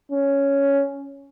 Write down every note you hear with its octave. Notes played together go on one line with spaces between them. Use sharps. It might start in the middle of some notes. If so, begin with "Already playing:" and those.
C#4